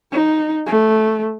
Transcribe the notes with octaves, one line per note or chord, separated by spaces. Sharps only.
D#4
A3